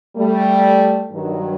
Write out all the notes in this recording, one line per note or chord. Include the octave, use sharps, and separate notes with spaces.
G3 A3
G2 D#3 F#3